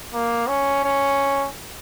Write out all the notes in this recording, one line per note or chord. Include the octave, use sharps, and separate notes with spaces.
A#3
C#4
C#4